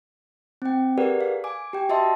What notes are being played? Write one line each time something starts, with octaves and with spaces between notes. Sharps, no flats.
C4 G5
G4 G#4 A#4 B4 D5 F#5
F5
G#5 D6
G4 G5
F#4 D#5 E5 A5 C6